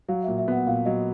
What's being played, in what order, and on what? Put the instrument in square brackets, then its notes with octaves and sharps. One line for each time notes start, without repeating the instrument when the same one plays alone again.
[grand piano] F#3 [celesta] F5
[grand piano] A#2 [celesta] E5
[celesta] E5
[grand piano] B3 [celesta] F#5
[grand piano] A#2 [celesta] F5
[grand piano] F#3 [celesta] D#5